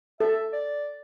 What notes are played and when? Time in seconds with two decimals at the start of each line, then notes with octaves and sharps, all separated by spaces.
0.20 A4 E5
0.53 D5